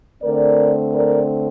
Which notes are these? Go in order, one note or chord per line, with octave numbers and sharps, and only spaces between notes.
D3 A3 C4 A#4 D5
A#4 D5